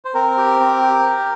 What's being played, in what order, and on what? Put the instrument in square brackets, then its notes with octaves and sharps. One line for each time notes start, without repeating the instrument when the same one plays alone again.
[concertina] C5
C4 A#4
G4
C4
G4